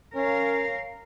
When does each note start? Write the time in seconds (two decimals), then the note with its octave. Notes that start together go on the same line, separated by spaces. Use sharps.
0.15 C#4 A#4 F5